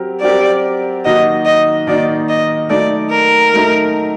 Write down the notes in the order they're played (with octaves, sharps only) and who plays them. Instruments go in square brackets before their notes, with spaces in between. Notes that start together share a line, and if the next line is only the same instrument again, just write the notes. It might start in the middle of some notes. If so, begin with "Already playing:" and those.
Already playing: [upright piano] F#3 C4 G4 A#4
[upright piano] F#3 C4 G4 A#4 [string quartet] D5
[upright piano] D#3 F#3 A#3 D#4 F#4 [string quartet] D#5
[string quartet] D#5
[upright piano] D#3 F#3 A#3 D#4 F#4 [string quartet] D5
[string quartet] D#5
[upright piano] F#3 A3 D#4 [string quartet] D5
[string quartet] A#4
[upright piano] F#3 A3 D#4